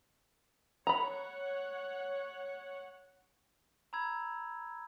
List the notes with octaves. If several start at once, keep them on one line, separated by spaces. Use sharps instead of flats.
C#5 F#5 A#5 B5
A#5 B5 E6 G#6